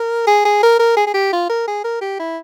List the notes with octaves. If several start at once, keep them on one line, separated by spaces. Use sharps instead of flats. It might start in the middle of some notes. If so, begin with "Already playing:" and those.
Already playing: A#4
G#4
G#4
A#4
A#4
G#4
G#4
G4
F4
A#4
G#4
A#4
G4
E4